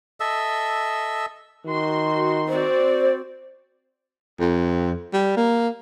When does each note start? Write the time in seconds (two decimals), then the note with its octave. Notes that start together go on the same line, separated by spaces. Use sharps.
0.20 A4 D#5 E5 E6
1.66 D#3 F#4 C6
2.48 C4 F#4 C5 D5
4.40 F2
5.13 G3
5.37 A#3